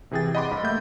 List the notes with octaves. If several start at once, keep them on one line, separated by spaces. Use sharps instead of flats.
C3 E3 G#4 G5 A6
D#5 F#5 B5 C6 D6 A6
G2 D#5 B5
A3 A#3 E5 G6